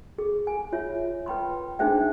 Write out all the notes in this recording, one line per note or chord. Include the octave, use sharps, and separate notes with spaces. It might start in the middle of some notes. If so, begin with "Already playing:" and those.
G#4
G#5
F4 C#5 E5
B4 G5 B5 C6
D4 D#4 G#4 C5 E5 G5